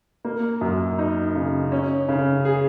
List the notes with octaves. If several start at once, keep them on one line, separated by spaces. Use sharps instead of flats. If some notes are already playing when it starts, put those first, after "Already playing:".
A#3
F#2
D#4
C#3
C#4
C#3
G#4